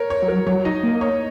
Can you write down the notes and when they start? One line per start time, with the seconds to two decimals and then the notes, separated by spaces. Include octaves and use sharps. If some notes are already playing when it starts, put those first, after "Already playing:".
Already playing: A#4 C#5
0.10 C#5
0.22 F#3
0.28 A#4
0.47 F#3 C#5
0.65 D#4 D#5
0.83 A#3
1.01 C#5